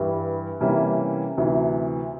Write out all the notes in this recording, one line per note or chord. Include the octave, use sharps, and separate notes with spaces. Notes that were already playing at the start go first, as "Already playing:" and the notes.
Already playing: G2 E3 G3
C3 E3 G3 A#3 C#4
D2 C3 E3